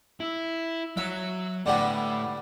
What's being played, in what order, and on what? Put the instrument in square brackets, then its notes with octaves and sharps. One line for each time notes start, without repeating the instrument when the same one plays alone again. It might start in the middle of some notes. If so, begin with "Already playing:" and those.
[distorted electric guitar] E4
[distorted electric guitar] F#3 C#5 [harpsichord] E5
[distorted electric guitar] A2 [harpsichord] D3 G3 B3